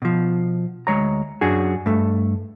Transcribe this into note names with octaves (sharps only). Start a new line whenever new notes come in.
B2 F3
D2 G#3 C#5 A#5
F#2 D4 F#4 G#4
G2 A3